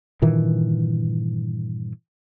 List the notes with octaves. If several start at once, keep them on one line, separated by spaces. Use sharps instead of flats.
G2 A#2 D#3 E3